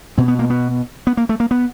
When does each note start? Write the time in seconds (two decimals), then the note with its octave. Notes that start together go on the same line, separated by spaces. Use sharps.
0.18 B2 C4
0.28 B3
0.39 A#3
0.50 B3
1.07 B3
1.17 A#3
1.29 A3
1.40 A#3
1.51 B3